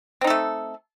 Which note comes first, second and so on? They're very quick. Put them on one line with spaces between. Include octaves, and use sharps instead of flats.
C4 D#4 A4 A3